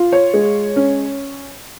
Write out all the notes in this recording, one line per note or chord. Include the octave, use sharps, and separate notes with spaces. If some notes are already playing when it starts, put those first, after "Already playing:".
Already playing: F4
C#5
G#3
C#4